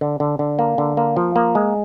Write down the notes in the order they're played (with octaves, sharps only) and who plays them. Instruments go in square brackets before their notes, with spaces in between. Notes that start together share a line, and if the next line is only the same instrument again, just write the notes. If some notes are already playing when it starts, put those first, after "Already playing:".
[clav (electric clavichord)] D3
D3
D3
A#3
D3
A#3
F3
A#3
G#3